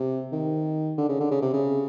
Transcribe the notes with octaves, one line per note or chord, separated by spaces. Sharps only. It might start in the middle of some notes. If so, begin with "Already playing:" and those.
Already playing: C3
D#3
D3
C#3
D3
C#3
C3
C#3